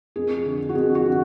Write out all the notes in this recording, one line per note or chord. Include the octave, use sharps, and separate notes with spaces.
F2 G#4
D3
F#4
F2 G#4
F#4
D3